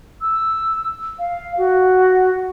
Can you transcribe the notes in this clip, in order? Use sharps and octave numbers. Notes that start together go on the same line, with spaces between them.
E6
F5
F#4